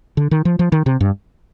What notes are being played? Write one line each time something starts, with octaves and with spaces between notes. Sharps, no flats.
D3
D#3
F3
F3
D#3
C3
G2